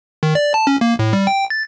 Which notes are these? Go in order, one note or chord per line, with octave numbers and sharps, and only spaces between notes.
D#3
D5
A5
C#4
A#3
A2
G3
G5
A6